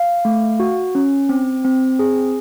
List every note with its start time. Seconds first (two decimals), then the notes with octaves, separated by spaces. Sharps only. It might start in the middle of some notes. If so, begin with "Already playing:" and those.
Already playing: F5
0.25 A3
0.60 F#4
0.95 C#4
1.29 C4
1.65 C4
1.99 G#4